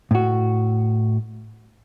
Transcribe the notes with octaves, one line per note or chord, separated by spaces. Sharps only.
A2 F#4